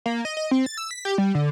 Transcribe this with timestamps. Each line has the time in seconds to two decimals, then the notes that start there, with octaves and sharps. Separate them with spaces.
0.06 A#3
0.25 D#5
0.37 D#5
0.51 C4
0.66 A6
0.77 E6
0.91 B6
1.05 G4
1.18 G3
1.35 D3